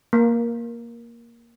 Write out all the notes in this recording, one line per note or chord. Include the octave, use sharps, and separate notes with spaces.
A#3